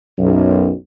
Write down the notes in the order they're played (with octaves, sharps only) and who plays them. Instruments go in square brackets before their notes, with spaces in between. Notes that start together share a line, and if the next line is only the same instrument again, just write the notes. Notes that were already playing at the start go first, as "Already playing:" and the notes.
[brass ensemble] B1 F#2